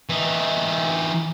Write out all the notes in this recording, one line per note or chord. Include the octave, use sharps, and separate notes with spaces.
E3 D#4